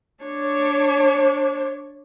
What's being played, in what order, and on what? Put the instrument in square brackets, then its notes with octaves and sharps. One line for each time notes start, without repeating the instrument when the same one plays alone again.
[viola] D4 C#5